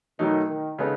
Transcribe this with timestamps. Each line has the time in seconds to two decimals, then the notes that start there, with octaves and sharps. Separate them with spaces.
0.19 B2 D#3 F#3 A3 D#4
0.49 D#3
0.78 C#3 G#3 B3 D#4 A4